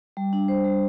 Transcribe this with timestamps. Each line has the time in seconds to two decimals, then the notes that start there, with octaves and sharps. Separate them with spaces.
0.17 G3
0.33 D4
0.48 C5
0.65 G3